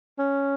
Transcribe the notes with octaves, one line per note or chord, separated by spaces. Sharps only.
C#4